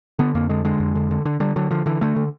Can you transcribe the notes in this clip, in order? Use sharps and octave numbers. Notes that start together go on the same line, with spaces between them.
D3 B3
F2 A#3
D3 G#3
D3 G#3
F2
D3
D3
D3
D3 G3
D3 F#3
D3 F3
D3 E3
D3 A3
D3